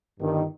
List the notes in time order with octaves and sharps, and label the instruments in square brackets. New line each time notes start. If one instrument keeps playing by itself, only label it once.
[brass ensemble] G1 G2 D#3